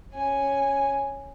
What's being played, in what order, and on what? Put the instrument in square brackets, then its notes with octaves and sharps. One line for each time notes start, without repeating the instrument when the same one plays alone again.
[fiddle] C#4 G#5